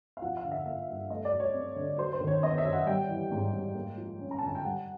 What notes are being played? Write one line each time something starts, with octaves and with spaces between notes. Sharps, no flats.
F5
F3 F#5
F5
D3
E5
A#3 E5
G2
A3 D#5
D5
F#3
C#5
C4
D3
F#3 C5
C5
D#3
C#5
B3 D#5
E5
F#2
F#5
G3 G5
E3
G#2
G#2
A#3
F3
C#4
A#5
D3 A5
G#5
G5
G3 F#5